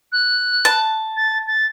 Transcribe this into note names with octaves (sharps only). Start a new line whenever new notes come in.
F#6
A5
A6
A6